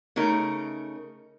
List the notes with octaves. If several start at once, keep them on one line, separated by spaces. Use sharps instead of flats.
C#3 A3 D#4 A#4